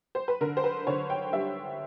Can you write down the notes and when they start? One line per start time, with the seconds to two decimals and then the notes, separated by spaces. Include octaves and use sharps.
0.15 C5
0.28 B4
0.41 D3 A#4
0.57 C5
0.64 B4
0.87 D3 C#5
1.10 G5
1.33 G3 E5